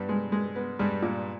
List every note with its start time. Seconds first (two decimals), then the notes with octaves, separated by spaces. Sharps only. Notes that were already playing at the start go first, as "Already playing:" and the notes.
Already playing: G2 G3 B3
0.09 G#3
0.32 G#3
0.56 B3
0.79 G2 G3 G#3
1.02 A#2